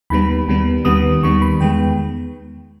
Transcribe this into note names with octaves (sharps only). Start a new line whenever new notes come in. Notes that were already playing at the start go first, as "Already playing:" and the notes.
D#2 D#3 G3 B3 B5
D#2 D#3 G3 B3
D#2 D#3 G3 B3 D#6
D#2 D#3 G3 B3 C#6
B5
E2 D#3 G#3 B3 G5